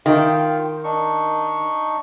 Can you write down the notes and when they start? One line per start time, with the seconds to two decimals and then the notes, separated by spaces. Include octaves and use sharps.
0.06 D#3 F4 G5
0.84 D4 D#4 C#6